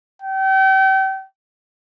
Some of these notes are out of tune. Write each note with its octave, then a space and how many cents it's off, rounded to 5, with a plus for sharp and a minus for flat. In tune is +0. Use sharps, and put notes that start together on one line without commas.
G5 -35